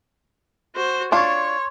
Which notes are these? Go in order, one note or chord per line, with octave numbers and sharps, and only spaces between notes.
F#4 C5
D4 F4 C#5 C6 C#6